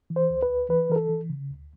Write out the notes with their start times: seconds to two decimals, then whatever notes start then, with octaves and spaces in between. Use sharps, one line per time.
0.10 E3
0.16 C5
0.30 D2
0.43 B4
0.49 D2
0.69 E3 B4
0.90 E3 A#4
0.96 A4
1.09 E3
1.30 C#3
1.49 D2